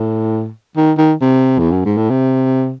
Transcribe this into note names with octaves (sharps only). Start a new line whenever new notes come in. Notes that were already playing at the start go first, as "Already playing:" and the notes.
Already playing: A2
D#3
D#3
C3
E2
F#2
G#2
A2
C3